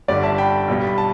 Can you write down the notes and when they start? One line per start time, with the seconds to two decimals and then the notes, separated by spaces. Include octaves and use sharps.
0.08 G1 G2 D3 G3 D5
0.23 E5 A5
0.38 G5 B5
0.68 B1 B2 G3
0.87 B5
0.98 A5